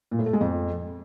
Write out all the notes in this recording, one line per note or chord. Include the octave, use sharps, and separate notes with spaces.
A#2
A2
A3
G#3
F2